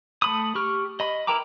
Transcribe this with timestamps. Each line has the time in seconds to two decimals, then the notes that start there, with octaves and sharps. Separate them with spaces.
0.22 A3 B5 D#6
0.55 G4 C#6 F6
1.00 D#5 B5
1.27 E4 A#4 G5 A#5 D6